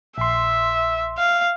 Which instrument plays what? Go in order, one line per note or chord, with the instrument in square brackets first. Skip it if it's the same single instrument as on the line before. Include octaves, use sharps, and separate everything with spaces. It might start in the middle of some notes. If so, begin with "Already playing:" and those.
[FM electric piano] A#1 C6 [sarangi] E5
[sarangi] F5